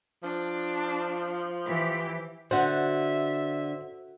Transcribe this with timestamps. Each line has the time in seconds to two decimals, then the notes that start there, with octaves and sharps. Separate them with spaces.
0.23 F3 D4
1.65 E3 G4
2.51 D3 F#4 C5 E5 F#5